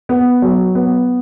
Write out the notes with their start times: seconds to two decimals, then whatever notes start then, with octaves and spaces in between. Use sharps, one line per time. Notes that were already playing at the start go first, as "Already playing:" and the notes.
0.09 B3
0.42 F#3
0.75 B3